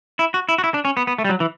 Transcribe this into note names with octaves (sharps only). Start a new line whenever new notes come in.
E4
F#4
E4
F#4
E4
D4
C#4
B3
B3
A3
G3
F#3
E3